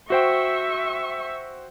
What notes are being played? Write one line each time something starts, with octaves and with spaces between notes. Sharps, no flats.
F#4 C5 E5 G5 C#6